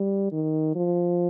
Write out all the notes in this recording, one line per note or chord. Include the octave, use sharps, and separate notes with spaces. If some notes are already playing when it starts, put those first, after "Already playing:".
Already playing: G3
D#3
F3